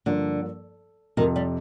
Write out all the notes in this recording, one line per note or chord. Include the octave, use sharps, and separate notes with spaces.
G2 D3 F3 A#3
F2 C3 D#3 F3
G3